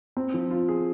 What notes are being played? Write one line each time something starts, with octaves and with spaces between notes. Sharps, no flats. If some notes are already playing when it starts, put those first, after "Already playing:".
C4
F3
F4
G#4